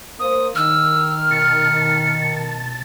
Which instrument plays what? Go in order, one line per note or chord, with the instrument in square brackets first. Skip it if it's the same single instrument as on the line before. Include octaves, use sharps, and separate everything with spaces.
[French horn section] A#3 C5 [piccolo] D#6
[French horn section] D#3 [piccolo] E6 [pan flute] F6
[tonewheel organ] B2 A5 A6 [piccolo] C#7